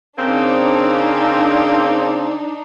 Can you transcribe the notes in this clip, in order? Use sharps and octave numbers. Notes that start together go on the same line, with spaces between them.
C#3 A#3 C4 D4 D#4